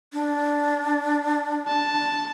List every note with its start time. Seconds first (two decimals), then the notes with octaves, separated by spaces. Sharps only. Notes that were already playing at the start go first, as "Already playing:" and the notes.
0.13 D4
1.68 A5